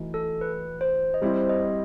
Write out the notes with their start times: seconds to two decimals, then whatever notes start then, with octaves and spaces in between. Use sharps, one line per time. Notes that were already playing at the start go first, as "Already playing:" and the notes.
Already playing: E3 A3 D#4 F#4
0.14 A4
0.41 B4
0.81 C5
1.14 D#5
1.22 G3 C4 E4 C5
1.49 D#5